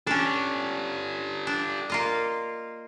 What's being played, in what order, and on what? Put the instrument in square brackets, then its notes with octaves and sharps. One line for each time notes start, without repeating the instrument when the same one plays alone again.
[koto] C#4 D4 [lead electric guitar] G4 A4
[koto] D4
A#3 F4 D#5